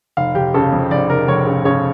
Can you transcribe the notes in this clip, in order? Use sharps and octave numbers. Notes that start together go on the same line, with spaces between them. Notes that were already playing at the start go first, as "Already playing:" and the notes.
F1 F5
F1 G4
C#3 A4
F2
F1 D5
F1 A#4
F1 C#5
C#3
C#3 C#5